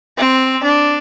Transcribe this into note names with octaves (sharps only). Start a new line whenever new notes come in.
C4
D4